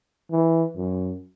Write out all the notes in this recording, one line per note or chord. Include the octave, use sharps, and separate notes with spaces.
E3
F#2